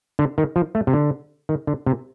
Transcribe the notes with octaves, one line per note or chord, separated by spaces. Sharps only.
D3
D#3
F3
A3
C3
D3
D#3
D3
C3